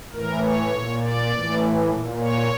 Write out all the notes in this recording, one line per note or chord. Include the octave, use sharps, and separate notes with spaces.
A2 E3 A#4
C#5
A#2
D5
A2 E3
A#2
C#5